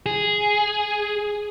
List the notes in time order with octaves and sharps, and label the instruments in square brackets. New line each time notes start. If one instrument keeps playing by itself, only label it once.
[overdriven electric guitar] G#4